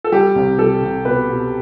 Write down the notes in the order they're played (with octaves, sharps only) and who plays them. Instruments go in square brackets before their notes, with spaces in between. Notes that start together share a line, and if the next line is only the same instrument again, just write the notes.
[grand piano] A4
G3 G4
C2
G3 A4
C2
B2 B4
B2